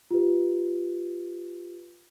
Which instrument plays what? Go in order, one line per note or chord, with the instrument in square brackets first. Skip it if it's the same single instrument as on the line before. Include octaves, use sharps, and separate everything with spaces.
[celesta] F4 G4 B4